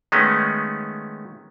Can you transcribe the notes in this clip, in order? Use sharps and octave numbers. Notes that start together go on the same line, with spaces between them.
D#3 G#3 A3 B3 C#4